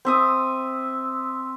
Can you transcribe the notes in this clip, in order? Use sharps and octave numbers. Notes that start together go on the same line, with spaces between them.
C4 E5 D#6